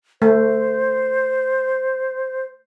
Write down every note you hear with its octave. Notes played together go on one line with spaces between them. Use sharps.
A3 C5